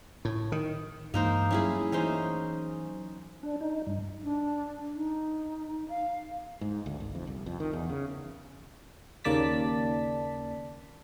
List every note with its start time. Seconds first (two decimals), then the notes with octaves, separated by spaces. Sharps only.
0.25 A2
0.52 D#3
1.14 G2 E3 G#3 A#3 D#4 C5
1.51 F#3 G3 A3 C#4 E4 G#4
1.92 E3 F#3 C#4 D#4 C5
3.43 D4
3.61 D#4
3.87 G2
4.23 D4
4.96 D#4
5.89 F5
6.61 G#2
6.86 D2
7.00 G#1
7.15 F2
7.27 C2
7.46 F2
7.60 D#3
7.73 E2
7.90 C#3
9.24 D#2 C#3 A#3 D5 A5 B6